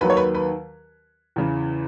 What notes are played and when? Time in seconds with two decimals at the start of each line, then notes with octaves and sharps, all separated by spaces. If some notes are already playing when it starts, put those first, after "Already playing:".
0.01 D#2 D#3 F#3 B4
0.10 C#5
0.17 B4
0.35 B4
1.36 E2 C#3 E3